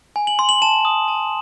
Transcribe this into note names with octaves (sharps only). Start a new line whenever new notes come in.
G#5
F#7
C6
F#7
A5 E7
D#6
A5